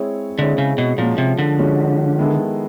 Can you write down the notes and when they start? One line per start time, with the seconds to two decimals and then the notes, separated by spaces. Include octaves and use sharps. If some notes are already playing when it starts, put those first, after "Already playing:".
Already playing: G#3 C4 E4 G#4 C#5
0.39 D3 G#3 C4 E4 G#4 C#5
0.58 C#3
0.78 B2
0.98 A#2 F3 G#3 C#4 F#4
1.18 C3
1.39 D3
1.58 F3 G#3 C#4 F#4
2.19 D#3 G#3 B3 E4 A4